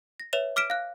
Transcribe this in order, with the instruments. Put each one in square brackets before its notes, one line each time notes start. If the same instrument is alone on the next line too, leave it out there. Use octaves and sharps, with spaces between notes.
[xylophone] A#6
B4 C#5 E5 E7 F7
D6 F6 B6 D7 E7
F5 F#6